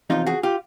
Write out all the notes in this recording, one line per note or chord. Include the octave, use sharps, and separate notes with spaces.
E2 C3 F3 D#4 F4
F#4 G#4
F4 G4